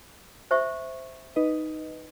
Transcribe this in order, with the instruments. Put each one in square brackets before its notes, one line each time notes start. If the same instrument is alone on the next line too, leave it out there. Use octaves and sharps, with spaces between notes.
[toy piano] C5 E5 C#6
[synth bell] D#4 B4 D#5